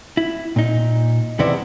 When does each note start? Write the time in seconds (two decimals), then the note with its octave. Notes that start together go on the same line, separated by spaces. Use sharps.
0.17 E4
0.56 A#2 D#4
1.39 E2 C3 B3 C4 E4 D5